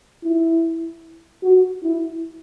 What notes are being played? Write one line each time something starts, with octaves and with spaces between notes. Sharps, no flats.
E4
F#4
E4